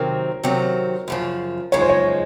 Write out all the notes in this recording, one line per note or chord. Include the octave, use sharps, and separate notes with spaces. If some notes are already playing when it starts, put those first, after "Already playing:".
Already playing: C3 D#3 F#3 C4 A#4
C3 D#3 F#3 C4
F#2 C#3 F3
F#2 C#3 F3 G#3 D#4 C#5
C5
C#5